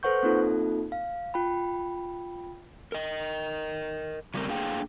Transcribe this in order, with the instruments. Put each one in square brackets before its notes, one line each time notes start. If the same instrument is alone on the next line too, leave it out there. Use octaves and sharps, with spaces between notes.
[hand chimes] A4 B4 C5 F#5 C#6 G6
A#3 C4 D#4 F4 A4
F5
F4 G5 B5
[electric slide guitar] A#4 D#5
C#3 F#3 G3 A3 C4 A#4
A3 A#3 D4 G#4 F5 G5